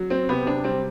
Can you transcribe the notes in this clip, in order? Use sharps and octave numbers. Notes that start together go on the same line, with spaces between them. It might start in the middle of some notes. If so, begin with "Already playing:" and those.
Already playing: F#3 F#4
F#3 C4
C3 B3
C3 D4
G3 C4